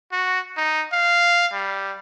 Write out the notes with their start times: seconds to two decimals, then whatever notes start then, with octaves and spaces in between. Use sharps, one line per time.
0.12 F#4
0.57 D#4
0.93 F5
1.53 G3